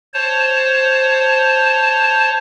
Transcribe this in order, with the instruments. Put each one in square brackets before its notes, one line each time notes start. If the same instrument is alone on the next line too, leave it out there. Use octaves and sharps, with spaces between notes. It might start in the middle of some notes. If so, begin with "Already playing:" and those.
[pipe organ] C5 C#5 A5